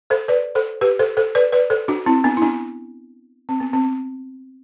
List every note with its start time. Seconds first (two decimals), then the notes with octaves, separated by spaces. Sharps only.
0.10 A4 C5
0.28 B4 D5
0.55 A4 C5
0.81 G4 B4
0.99 A4 C5
1.17 A4 C5
1.35 B4 D5
1.52 B4 D5
1.70 A4 C5
1.88 D4 F#4
2.06 C4 E4
2.24 B3 D4
2.37 E4
2.42 B3 D4
3.49 C4
3.60 B3
3.73 C4